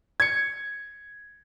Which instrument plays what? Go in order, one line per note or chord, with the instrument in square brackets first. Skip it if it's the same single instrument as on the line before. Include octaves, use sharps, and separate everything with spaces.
[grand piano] G#6 C#7